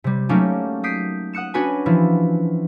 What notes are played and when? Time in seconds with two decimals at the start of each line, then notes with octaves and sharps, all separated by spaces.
0.04 C3 G3
0.29 F#3 A3 A#3 C#4 D#4 G4
0.84 D#6 G6 B6 C7 D7
1.33 F#5 D#6 F#6 C#7 E7
1.54 C#4 D4 F#4 B4 G#5
1.86 E3 F3 E4